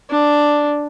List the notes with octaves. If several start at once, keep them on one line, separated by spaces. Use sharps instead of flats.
D4